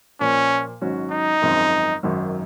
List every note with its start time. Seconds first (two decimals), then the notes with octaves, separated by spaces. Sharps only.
0.20 A#2 F3 A#3 C#4
0.81 G#1 G#2 F#3 C#4 F#4
1.11 D#4
1.42 G#1 F#2 F3 G#3 C4
2.03 G#1 F#2 D#3 F#3